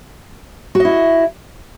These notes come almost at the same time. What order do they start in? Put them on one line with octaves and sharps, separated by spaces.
F#4 D#5 E4